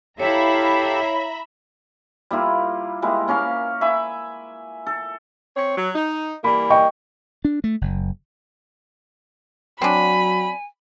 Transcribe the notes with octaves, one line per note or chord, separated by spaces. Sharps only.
E4 G4 A4 C#5 E5 F5 A#5 B5
G3 A#3 E4 F4
G3 G#3 A#3 E4
A#3 C#4 A#4 F5
E5 G#5 B5 D6
A4
C4 C#5
F#3
D#4
E3 G3 A#3 B5
D#5 G5 C#6
D4
A3
F#1
F#3 C4 D4 G#5 B5